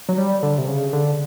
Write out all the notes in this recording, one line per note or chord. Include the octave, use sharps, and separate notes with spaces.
F#3
G3
D3
C3
C#3
D3